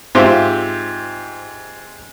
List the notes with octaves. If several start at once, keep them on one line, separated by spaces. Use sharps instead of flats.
G#2 C4 F4 G4 C5 E5